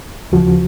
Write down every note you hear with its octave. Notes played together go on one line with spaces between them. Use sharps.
D#2 C#3 F3 F#4